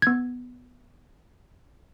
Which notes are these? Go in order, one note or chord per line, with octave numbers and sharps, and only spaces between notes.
B3 G#6